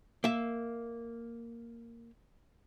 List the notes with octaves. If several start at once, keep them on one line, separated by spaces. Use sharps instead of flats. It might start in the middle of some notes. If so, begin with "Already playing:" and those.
A#3 E5